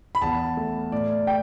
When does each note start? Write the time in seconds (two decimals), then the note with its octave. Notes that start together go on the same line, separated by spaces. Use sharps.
0.15 B5
0.22 E2 A5
0.57 A3
0.91 A2 D5
1.27 G5